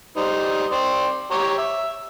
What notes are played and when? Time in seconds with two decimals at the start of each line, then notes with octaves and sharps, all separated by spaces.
0.17 G3 D#4 C5
0.72 C4 C5 D5
1.31 G4 C#5 A#5
1.58 E5